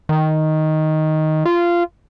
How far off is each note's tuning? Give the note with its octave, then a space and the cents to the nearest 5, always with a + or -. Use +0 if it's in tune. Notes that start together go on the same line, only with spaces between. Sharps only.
D#3 +5
F4 -15